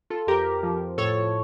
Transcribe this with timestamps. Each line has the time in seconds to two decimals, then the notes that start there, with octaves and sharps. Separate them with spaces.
0.10 F4 A4
0.27 F2 G4 A#4
0.63 F3
0.98 A2 A4 C#5